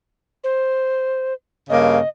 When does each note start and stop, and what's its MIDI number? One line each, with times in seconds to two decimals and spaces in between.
0.44 1.33 72
1.70 1.98 43
1.70 1.98 49
1.70 1.98 58
1.70 2.09 75